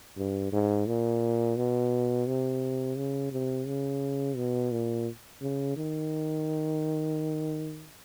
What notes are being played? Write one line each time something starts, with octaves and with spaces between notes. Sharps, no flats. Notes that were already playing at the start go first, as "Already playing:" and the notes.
G2
G#2
A#2
B2
C3
C#3
C3
C#3
B2
A#2
C#3
D#3